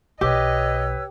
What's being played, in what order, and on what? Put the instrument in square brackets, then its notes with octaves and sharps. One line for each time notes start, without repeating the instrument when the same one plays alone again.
[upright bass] B1 B2 [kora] G4 [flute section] B4 C#5 E6 [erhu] D#5